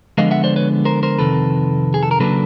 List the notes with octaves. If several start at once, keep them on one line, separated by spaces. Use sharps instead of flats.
D3 F3 G#3 B3 D#5 F5
E5 F#5
C5 D5
B4 C#5
A#4 C5
A#4 C5
F2 C3 D#3 A4 B4
G#4
A4
A#4
C#3 F#3 A#3 D4 A4 B4